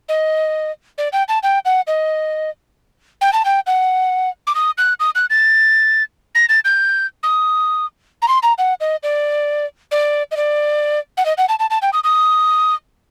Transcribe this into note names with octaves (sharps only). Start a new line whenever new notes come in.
D#5
D5
G5
A5
G5
F#5
D#5
G5
A5
G5
F#5
D6
D#6
F#6
D#6
F#6
A6
A#6
A6
G6
D#6
A#5
C6
A#5
F#5
D#5
D5
D5
D#5
D5
F#5
D#5
F#5
A5
A5
A5
G5
D#6
D#6